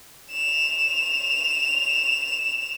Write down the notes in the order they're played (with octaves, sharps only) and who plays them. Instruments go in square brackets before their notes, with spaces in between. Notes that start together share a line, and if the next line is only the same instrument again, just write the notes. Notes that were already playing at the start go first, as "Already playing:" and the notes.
[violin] E7 F7